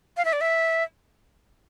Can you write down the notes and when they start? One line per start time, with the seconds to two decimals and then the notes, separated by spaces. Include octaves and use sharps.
0.17 F5
0.25 E5
0.33 D5
0.41 E5